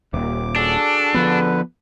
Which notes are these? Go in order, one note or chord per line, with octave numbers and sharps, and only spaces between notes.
D#1 D#2 D6
D4 F#4 G#4 A4
D3 F3 B3 B4